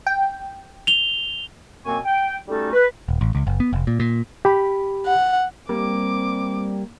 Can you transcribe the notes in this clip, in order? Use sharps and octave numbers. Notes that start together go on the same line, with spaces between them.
G5
F7 G7
F#2 B2 A#3 C4 G#5 C#6
G5
G3 A3 C#4 D#4 F#4 A4
B4
D#1
A1
C#2
F#1
B3
F1
A#2
A#2
G4 B5
F#5
G3 A#3 C4 D6